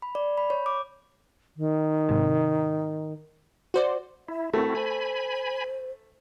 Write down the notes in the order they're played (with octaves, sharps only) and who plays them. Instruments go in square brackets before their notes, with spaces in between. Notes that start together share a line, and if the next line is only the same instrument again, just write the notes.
[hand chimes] B5
D5
B5
C#5
D6
[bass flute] D#3
[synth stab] G#2 C3
F#4 C5 D5
[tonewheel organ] E4 [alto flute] E5
[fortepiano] A3 [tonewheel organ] C4 E4 F#4 [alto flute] A#4
[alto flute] C5 [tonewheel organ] G#5 B5